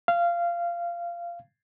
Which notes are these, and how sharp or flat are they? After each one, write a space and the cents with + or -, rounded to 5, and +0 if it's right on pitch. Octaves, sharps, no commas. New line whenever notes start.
F5 -20